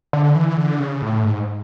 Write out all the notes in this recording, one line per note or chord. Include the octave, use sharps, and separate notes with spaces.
D3
E3
D3
C#3
A2
G#2